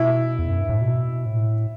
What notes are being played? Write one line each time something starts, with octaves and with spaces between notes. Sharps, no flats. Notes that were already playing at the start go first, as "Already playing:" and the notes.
Already playing: B2 E4
E2
F#2
G2
A2
B2
A2